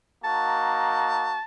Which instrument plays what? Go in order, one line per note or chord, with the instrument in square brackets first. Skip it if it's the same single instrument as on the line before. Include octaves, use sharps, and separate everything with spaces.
[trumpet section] A#3 D#4 F#4 [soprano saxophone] A5